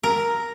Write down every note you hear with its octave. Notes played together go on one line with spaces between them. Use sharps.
A#4